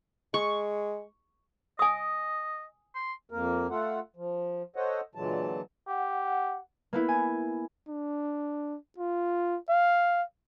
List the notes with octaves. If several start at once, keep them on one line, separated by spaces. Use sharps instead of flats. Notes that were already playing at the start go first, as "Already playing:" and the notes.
G#3 C#6
D#5 G#5 D#6
C6
F2 A#3 A#4
A3 F4 A4 F#5
F3
A4 C5 C#5 D#5 F#5
A#2 D3 E3 F#3 G#3 A5
G4 F#5
A#3 B3 E4
G#5
D4
F4
F5